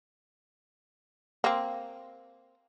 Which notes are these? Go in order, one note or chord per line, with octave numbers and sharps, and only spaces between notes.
A#3 C4